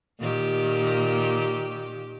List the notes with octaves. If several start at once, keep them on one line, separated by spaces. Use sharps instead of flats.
A#2 D#3 G4